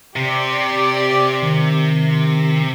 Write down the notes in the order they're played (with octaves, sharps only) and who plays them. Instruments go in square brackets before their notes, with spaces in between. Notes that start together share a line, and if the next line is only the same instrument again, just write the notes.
[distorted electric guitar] C3 [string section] G4 D5
[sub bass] D#3